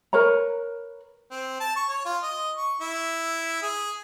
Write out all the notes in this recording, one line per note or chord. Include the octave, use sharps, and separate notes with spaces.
A#4 B4 C#5 A#5
C4
A5
C#6
C#5
F4
D#5
C#6
E4
G#4